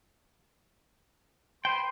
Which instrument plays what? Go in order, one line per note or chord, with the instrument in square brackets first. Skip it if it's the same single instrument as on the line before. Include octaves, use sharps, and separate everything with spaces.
[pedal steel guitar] B4 C5 G5 [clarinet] C6